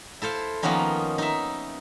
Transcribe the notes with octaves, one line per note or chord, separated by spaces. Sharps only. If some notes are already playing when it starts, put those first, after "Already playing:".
E4 A4 C5 F5
D#3 F3 A#3 B3 C#4 D#4
D#4 E5